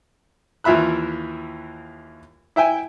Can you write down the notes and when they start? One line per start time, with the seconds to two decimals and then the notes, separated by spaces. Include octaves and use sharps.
0.64 D#2 E3 F4 E5 B5 F#6
2.56 E4 E5 G5 G#5